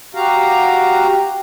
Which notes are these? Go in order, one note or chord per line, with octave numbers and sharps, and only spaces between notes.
F#4 G4 F5 A#5